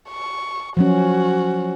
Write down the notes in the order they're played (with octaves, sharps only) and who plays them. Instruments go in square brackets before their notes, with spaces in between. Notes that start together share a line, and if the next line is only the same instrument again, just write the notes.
[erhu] C#6
[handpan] F3 F#3 C#4 [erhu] F#4